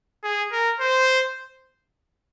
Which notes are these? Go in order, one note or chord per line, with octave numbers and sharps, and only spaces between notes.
G#4
A#4
C5